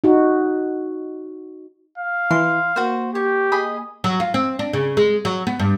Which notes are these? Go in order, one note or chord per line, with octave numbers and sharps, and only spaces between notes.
D#4 F#4
F5
E3 C6
A#3 F#4 C5
G4 C#5
G#4 D#5 B5
F#3
F4
C4
D4
C#3
G#3
F#3
B3
G2